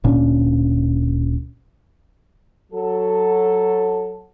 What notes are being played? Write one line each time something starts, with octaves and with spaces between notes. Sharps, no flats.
D1 A#2 C#4 D4
F#3 A4